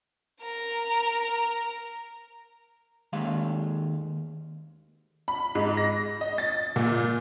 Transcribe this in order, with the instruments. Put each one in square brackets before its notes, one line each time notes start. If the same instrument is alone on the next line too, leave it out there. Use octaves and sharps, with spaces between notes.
[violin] A#4 A#5
[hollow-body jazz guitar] D#2 G#3 F5
[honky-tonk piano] B5
G#2
A#6
D#5
A6
A#2